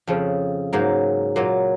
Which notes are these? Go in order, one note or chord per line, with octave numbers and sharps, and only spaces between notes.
F2 C#3 F3
G#2 F#3 A#3
A#2 F#3 A#3